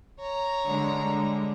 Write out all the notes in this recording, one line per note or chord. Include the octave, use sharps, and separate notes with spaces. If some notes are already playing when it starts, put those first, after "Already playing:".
C#5 A#5
D3 G3 G#3